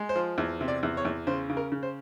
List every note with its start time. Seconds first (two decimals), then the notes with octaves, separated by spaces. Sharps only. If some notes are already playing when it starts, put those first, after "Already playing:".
Already playing: G#3
0.09 C5
0.16 F3
0.38 E2
0.61 C3
0.68 D5
0.83 E2
0.97 C#5
1.05 E2
1.27 C#3 C5
1.50 C#3
1.57 A#4
1.72 C#3
1.83 C5